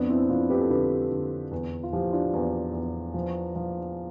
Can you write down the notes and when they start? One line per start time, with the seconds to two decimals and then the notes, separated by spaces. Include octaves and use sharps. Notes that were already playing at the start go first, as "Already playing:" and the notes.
Already playing: F2 B3 D4
0.09 C4 E4
0.29 F2 D4 F4
0.50 G4 B4
0.61 A4
0.70 D3 G4 B4
1.11 D3
1.51 E2
1.83 F4
1.93 F3 E4 G4
2.12 D4 F4
2.33 E2
2.73 E2
3.14 F3
3.56 F3